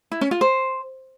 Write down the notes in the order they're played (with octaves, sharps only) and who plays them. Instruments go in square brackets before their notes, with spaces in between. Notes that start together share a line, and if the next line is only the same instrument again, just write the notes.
[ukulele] E4
C#4
F4
C5